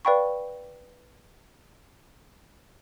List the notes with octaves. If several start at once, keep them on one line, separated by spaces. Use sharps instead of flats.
B4 D5 F5 G5 B5 C#6